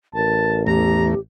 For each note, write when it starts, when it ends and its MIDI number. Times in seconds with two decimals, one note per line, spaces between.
0.15 1.17 33
0.15 0.67 70
0.15 0.60 81
0.67 1.15 40
0.67 1.15 57
0.67 1.19 67
0.67 1.06 82